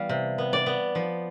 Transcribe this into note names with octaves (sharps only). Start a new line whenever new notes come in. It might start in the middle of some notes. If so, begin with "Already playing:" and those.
Already playing: E3 G3 B3 F5
C3
B3
D5
B3
F3